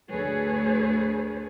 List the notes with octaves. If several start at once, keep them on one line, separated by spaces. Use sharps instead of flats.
D2 G#4 A4 B4 C#5